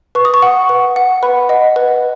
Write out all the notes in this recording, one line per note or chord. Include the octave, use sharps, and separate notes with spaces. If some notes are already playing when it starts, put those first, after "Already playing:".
B4 C#6
D#6
C#6
F#5
B4
F#5
B4 B5
D#5 F#5
B4